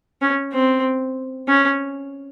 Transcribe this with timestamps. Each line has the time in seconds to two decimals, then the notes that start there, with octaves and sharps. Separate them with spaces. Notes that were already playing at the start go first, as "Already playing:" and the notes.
0.22 C#4
0.53 C4
1.48 C#4